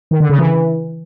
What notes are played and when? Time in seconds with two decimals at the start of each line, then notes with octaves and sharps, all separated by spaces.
0.11 D#3
0.20 D3
0.29 C#3
0.38 E3